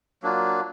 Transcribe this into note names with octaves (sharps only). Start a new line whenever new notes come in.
F#3 A#3 D4 F4